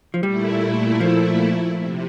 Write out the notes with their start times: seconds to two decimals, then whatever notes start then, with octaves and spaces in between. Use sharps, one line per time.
0.14 F3
0.23 A#2 G3 A3 E4
1.00 F3
1.78 C3